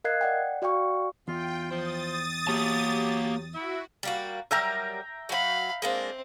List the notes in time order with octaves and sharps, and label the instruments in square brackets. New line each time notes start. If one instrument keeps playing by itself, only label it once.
[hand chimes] A#4 D#5 F5 F#6 G#6 C7
D5 F#5 G5
F#4 D5 F5 G5 C#6
[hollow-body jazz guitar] E2 [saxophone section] F4 [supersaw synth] G5
[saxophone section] F3 C5 [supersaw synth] D#6 A6
[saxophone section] F#3 G4 [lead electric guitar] A#3 A5
[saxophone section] E4 E5 [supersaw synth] F#4
[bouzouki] G3 A#3 F#4
[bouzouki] F#3 G3 A#4 [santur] E5 G5 A#5
[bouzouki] F#3 F#5 [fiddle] F5 B5
[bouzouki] G#3 A#3 D4 [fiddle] C4